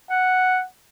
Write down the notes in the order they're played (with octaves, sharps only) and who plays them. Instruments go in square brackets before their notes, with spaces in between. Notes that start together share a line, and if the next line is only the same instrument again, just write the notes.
[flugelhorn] F#5